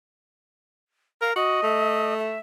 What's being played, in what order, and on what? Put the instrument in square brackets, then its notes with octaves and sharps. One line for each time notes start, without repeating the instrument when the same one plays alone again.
[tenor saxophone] A#4 [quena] F5
[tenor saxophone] F#4 [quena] D#5
[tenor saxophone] A3
[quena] E5